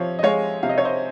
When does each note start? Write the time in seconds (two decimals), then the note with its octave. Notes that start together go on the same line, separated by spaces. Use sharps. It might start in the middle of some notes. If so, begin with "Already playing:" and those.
Already playing: C3 F3 C#5 F5
0.19 D#5
0.23 G#3 C#5 F5
0.63 C3 F5
0.69 D#5
0.78 C#5
0.85 C5 D#5